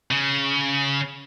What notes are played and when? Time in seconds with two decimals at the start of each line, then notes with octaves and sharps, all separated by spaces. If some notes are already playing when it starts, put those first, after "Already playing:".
0.11 C#3